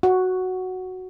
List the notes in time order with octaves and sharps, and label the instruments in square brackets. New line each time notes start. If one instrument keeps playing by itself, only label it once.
[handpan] F#4